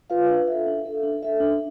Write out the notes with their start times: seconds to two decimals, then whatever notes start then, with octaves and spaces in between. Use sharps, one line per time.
0.10 F4 B4 F5
0.29 D4
0.48 A4 E5
0.67 D4
0.85 A4 E5
1.03 D4
1.23 A4 E5
1.40 D4